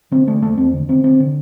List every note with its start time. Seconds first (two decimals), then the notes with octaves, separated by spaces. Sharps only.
0.11 D3 C4
0.27 D3 A3
0.42 E2 A3
0.58 E2 C4
0.74 D3
0.89 D3 C4
1.04 D3 C4
1.20 D3